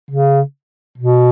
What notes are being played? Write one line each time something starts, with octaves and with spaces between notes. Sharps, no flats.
C#3
B2